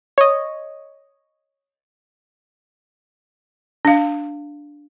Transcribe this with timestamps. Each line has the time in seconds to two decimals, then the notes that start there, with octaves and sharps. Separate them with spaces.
0.18 C#5 D#5
3.85 D4 F5